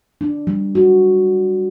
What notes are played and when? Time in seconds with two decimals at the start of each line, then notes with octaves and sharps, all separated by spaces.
0.21 D4
0.47 G3
0.75 F#4